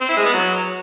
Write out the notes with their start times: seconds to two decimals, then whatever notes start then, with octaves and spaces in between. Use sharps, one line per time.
0.01 C4
0.09 E4
0.17 G#3
0.25 B3
0.33 F#3